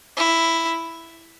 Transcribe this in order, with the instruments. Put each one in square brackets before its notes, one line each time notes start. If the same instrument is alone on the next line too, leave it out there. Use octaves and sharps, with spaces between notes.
[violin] E4